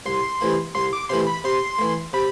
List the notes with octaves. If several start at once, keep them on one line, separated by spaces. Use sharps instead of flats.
C2 C6
C3 E3 A3 E4
C2 C6
D6
C3 E3 A3 E4 C6
B5
C3 C6
E3 A3
C3 B5